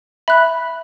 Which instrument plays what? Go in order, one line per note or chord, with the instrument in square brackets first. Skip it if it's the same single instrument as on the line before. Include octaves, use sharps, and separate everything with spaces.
[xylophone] E5 B5 F#6